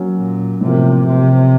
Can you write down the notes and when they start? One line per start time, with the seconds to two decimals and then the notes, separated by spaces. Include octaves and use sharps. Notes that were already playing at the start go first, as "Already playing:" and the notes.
Already playing: F#3 A#3 C#4
0.18 A#2
0.61 A2 C3 F3 A#3
1.06 C3